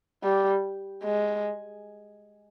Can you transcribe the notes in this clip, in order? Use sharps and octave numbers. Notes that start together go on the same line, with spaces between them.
G3
G#3